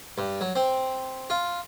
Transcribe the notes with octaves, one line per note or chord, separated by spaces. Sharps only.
G2
F#3
C4
F4